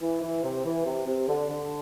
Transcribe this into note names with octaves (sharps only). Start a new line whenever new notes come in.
E3
E3
C3
E3
C3
C3
D3
D3